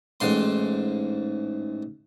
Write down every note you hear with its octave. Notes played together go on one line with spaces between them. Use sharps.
A1 G#2 C6